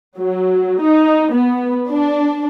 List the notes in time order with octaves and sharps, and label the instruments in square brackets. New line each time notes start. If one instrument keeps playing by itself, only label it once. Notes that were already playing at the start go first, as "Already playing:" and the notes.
[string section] F#3
D#4
B3
D4